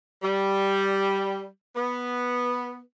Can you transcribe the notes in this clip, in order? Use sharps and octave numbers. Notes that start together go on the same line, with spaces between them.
G3
B3